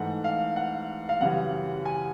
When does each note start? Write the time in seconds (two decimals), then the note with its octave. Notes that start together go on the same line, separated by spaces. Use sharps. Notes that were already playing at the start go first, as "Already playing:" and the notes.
Already playing: G#2 E3 A3 F#5
0.24 F5
0.56 F#5
1.09 F5
1.21 F#2 C#3 E3 G3 F#5
1.85 G#5